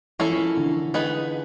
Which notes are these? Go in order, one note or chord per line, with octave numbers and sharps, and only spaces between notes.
E3 A#3 C#4 E4 A4
F3
E3
D3
B3 D#4 G#4 B4